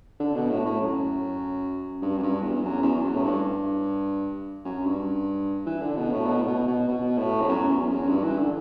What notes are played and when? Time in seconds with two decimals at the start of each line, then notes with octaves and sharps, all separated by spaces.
0.20 D3
0.35 B2
0.50 A2
0.65 A2
0.81 F#2
2.02 G2
2.18 F#2
2.23 G2
2.42 E2
2.62 F#2
2.83 E2
3.03 F#2
3.15 A2
3.24 G2
4.65 F#2
4.86 G2
5.66 E3
5.82 D3
5.97 B2
6.12 A2
6.27 B2
6.42 A2
6.47 B2
6.67 B2
6.88 B2
7.18 A2
7.41 E2
7.49 F#2
7.69 E2
7.89 F#2
8.09 G2
8.24 E3
8.39 D3